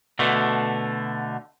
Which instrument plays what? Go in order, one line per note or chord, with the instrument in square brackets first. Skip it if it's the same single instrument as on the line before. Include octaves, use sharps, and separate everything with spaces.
[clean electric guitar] B2 D3 A3